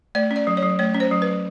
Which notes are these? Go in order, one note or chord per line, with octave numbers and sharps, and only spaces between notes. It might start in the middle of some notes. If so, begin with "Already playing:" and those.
A3 D5
C#4
D5
F#3
C#5
F#3
A3 C#5
C#4
C5
F#3
B4
F#3